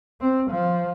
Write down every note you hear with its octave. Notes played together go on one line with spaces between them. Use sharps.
C4
F3